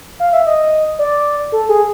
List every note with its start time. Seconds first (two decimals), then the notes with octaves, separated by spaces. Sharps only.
0.20 F5
0.33 E5
0.46 D#5
0.99 D5
1.52 A4
1.69 G#4